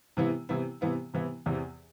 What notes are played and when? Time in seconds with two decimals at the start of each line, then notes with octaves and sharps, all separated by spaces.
0.17 C3 E3 B3 E4
0.49 C3 E3 B3 E4
0.81 C3 E3 B3 E4
1.14 C3 E3 B3 E4
1.46 E2 C3 E3